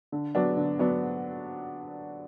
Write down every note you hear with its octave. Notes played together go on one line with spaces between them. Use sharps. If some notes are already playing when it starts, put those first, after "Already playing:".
D3
F#3 B3 D4
D3
F#3 B3 D4